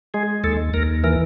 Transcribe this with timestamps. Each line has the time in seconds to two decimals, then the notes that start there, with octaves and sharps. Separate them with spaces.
0.14 G#3 G#4
0.44 D#2 A4
0.74 D#2 A#4
1.04 E3 A#4